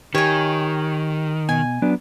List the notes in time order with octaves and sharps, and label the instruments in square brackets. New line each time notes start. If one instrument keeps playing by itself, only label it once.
[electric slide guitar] D#3 [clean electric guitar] G4 [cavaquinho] C#5 G#5
[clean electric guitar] B2 [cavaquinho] G#5
[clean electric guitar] F#3 B3 D4